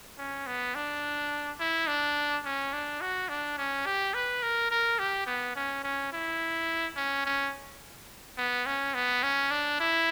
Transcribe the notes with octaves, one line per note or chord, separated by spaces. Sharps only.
C#4
B3
D4
E4
D4
C#4
D4
F#4
D4
C#4
G4
B4
A#4
A#4
G4
B3
C#4
C#4
E4
C#4
C#4
B3
C#4
B3
C#4
D4
E4